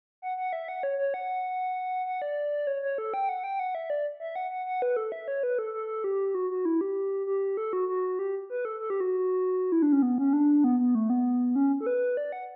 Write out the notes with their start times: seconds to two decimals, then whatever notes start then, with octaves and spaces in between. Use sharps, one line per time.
0.22 F#5
0.37 F#5
0.53 E5
0.68 F#5
0.83 C#5
0.99 C#5
1.14 F#5
2.06 F#5
2.22 D5
2.67 C#5
2.82 C#5
2.98 A4
3.14 G5
3.29 F#5
3.44 G5
3.60 F#5
3.75 E5
3.90 D5
4.20 E5
4.36 F#5
4.51 F#5
4.66 F#5
4.82 B4
4.97 A4
5.12 E5
5.28 C#5
5.43 B4
5.59 A4
5.74 A4
6.04 G4
6.35 F#4
6.50 F#4
6.65 E4
6.81 G4
7.27 G4
7.57 A4
7.73 F#4
7.88 F#4
8.19 G4
8.50 B4
8.65 A4
8.80 A4
8.90 G4
9.00 F#4
9.72 E4
9.82 D4
9.92 C#4
10.02 B3
10.18 C#4
10.33 D4
10.64 B3
10.79 B3
10.95 A3
11.10 B3
11.56 C#4
11.81 A4
11.86 B4
12.17 D5
12.32 F#5